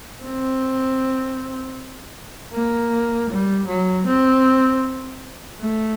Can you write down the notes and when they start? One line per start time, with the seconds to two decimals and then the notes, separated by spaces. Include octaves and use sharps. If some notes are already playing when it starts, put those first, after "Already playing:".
0.23 C4
2.52 A#3
3.30 G3
3.67 F#3
4.06 C4
5.60 A3